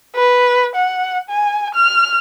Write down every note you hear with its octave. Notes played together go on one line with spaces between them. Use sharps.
B4
F#5
G#5
F6